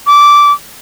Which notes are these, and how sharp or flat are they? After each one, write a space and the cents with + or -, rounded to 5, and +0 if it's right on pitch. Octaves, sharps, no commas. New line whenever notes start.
D6 -10